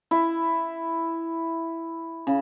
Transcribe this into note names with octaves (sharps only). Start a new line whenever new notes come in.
E4
C#3